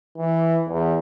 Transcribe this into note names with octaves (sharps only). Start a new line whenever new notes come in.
E3
E2